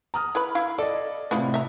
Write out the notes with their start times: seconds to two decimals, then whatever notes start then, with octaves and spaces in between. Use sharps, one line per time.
0.14 A#5 D#6 F6
0.35 E4 B4 B5
0.55 E4 F5
0.78 A4 D5 D#5
1.31 A2 C3 B3 E4 F4
1.54 E5 A#5